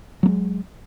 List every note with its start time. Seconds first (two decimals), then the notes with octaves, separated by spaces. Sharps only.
0.23 F#3
0.26 A#3
0.28 G#3